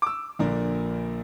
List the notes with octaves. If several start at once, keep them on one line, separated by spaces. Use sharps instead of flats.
D6 E6
A#1 A#2 D3 A#4 D5